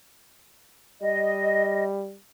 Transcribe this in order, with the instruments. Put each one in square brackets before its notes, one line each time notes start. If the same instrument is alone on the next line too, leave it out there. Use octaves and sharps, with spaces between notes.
[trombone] G3 [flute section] D#5